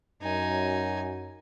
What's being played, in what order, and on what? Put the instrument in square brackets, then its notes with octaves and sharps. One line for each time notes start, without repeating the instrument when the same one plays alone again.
[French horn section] F#2 [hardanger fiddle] D#4 G#5